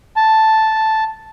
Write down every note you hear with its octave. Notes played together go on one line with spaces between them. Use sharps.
A5